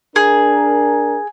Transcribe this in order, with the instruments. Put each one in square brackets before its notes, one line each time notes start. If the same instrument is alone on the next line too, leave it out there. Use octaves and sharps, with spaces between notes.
[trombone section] D4 A#4 [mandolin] G#4